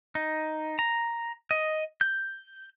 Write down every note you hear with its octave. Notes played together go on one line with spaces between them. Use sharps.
D#4
A#5
D#5
G6